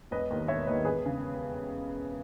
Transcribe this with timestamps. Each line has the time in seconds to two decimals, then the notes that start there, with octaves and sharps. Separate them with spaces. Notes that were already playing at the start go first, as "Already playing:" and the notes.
0.11 E1 B4 D#5
0.30 D#2 D#3
0.48 E1 C#5 E5
0.67 D#2 D#3 B4 D#5
0.85 E1 G#4 B4
1.06 C#3